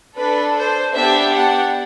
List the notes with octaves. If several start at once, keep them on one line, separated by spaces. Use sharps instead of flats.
D4 A4 B4
C5
B3 D4 G4 E5
F#5